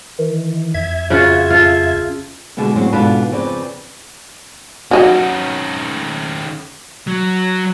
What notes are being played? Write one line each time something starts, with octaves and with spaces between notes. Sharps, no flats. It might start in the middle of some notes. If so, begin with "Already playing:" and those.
D#3 E3
F2 E5 G#6
C#3 F4 F#4
F4 A4
B2 D3 G3 G#3 B3
A2 C#3 F#3 G#3 C4 F#4
G#2 B2 D4 F4 A4 B4
F2 C#3 C4 B4 D5
D#3 F#3 C#4 D#4
F#3